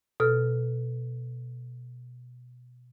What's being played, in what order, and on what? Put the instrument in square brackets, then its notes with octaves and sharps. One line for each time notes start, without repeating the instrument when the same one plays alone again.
[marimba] B2 A4 F6